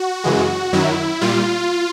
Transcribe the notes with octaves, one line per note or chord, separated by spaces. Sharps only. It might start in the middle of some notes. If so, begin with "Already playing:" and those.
Already playing: F#4
F#2 C#3 E3 G#3
F#2 D#3 F#3 E4
A#2 G3 F4